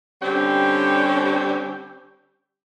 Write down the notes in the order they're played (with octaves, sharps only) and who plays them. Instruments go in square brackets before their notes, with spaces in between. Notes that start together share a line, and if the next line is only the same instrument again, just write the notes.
[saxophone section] D3 G3 C4 C#4 G4